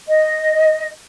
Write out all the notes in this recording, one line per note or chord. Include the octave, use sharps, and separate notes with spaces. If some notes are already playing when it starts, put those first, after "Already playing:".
D#5